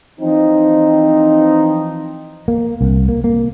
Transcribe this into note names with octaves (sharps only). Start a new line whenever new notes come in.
E3 F3 C4 D#4
A#3
C2
A#3
A#3